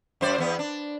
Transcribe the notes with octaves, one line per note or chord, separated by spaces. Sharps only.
F#2 C5 D5
E2 B3
D4